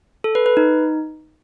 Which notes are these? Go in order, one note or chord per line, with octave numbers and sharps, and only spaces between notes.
A4
B4
B4
D#4